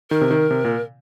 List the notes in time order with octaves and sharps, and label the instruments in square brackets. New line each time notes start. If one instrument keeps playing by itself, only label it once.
[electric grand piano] D#3 [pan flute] A#4
[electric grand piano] C3
D#3
C3
A#2